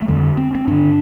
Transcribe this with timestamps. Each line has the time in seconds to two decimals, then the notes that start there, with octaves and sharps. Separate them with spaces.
0.02 A3
0.08 F2 D3 G3
0.37 C4
0.55 C4
0.67 G2 D3 D4